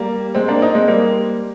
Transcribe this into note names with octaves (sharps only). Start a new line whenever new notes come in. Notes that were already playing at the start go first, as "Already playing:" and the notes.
Already playing: G3 A#3
G#3 C4
A#3 D4
C4 D#4
G#3 C4
G3 A#3